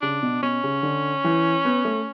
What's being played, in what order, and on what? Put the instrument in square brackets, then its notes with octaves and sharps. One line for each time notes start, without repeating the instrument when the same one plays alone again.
[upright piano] C#3 [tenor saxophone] D4
[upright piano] B2
[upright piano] B2 [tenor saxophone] C#4
[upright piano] C#3
D3
E3
B3
A3